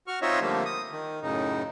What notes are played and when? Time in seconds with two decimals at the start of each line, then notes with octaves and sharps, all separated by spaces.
0.07 F#4 C#6 F6
0.22 C4 D#4 F4 C#5 D#5 E5
0.40 D3 F3 G3 A3 A#3
0.65 D#6
0.91 D#3
1.22 F#2 A2 C#3 D#4